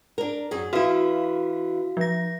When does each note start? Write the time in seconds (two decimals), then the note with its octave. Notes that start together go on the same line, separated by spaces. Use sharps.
0.18 D4 A#4
0.51 F#2 G#4
0.73 E3 E4 F#4 F5
1.97 F3 A#6